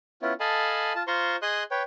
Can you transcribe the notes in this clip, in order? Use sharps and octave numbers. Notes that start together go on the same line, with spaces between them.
B3 C#4 E4 F4
A4 D#5 F5 G#5 A5 B5
F4 A5
F4 C5 A#5 C6 C#6
G#4 D#5 C6 D#6 F#6
B4 C#5 G5